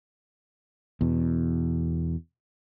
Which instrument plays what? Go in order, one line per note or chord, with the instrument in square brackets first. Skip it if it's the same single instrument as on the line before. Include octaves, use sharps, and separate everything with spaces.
[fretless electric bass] E2 B2